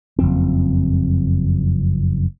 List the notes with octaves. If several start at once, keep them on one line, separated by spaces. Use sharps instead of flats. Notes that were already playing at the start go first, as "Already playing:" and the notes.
F#1 F2 C4